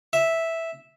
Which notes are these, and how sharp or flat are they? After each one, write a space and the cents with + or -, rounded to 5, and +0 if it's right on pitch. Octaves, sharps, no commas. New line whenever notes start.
E5 -5